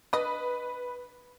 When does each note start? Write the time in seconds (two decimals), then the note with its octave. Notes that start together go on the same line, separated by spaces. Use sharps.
0.13 D4 B4 D#5